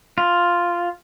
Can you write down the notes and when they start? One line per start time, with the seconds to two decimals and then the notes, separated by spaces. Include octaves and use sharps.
0.18 F4